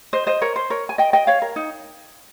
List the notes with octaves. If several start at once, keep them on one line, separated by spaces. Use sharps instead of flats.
C5 D#5
C5 D#5
A#4 C#5
C5
A#4 C#5
G#5
D#5 G5
D#5 G5
C#5 F5
A#4
D#4